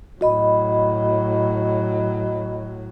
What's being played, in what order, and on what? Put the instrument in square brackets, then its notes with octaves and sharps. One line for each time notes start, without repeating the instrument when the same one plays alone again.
[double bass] A2 F#3 [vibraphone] F#4 D#5 B5